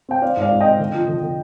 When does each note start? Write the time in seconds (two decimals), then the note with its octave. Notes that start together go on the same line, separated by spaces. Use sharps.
0.09 C4 G5
0.22 C4 D5 F5
0.37 G#2 D5 F5
0.51 G#2
0.60 C4 D#5 G5
0.79 D3
0.94 F3
1.08 D3
1.23 D3